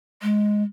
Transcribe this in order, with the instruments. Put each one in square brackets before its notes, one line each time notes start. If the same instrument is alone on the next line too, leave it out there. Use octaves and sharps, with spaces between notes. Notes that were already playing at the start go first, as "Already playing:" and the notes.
[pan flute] G#3